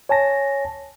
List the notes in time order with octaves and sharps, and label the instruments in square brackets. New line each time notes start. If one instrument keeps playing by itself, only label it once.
[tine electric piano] C#5 G#5 A5 A#6